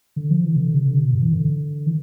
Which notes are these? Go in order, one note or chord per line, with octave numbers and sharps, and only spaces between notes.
D3
F3
E3
C3
D3
C3
D3
C3
B2
G2
E3
D3
E3